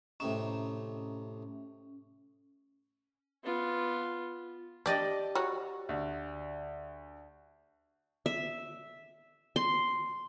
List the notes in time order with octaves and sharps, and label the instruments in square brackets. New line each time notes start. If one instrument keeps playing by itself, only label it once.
[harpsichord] A2 C3 D#4 [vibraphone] C#4
[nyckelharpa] B3 F4
[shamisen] D4 [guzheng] G4 D5 D#5
[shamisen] F#4 C#5
[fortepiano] D2
[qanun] E5
C6